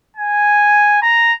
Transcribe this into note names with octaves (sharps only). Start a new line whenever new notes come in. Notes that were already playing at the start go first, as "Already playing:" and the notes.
G#5
A#5